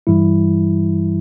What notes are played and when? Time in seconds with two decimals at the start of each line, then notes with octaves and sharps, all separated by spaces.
0.07 G2 E3 G3 E4